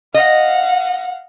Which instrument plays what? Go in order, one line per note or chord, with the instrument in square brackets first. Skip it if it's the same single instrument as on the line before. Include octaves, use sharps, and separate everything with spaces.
[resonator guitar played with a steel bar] D#5 [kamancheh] F5 F#5